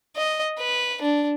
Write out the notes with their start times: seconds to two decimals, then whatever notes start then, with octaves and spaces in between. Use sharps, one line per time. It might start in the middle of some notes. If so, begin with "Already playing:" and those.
0.16 D#5
0.58 B4
1.02 D4